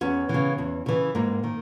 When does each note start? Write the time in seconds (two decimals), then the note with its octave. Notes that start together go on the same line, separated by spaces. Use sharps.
0.01 E2 B3 C#4
0.29 C#3 E3
0.58 E2
0.86 C#3 E3
1.15 G#2 A#3 C4
1.44 D#3